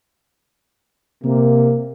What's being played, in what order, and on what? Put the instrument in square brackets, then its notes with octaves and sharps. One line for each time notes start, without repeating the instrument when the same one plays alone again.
[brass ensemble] C3 A#3